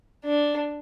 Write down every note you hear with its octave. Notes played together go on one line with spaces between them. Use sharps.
D4